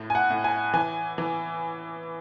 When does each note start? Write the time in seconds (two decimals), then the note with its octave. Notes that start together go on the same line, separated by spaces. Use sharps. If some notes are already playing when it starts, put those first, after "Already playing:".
Already playing: A2
0.10 G#5
0.15 F#5
0.30 A2
0.44 G#5
0.74 E3 G#5
1.18 E3